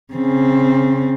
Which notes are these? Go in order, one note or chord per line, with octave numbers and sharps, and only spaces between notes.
C#3 C4